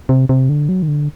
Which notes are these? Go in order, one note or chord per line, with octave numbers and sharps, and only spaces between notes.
C3
C3
D3
F#3
D#3
D3